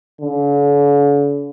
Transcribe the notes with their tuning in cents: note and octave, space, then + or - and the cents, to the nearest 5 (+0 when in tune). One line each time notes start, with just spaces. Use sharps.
D3 -45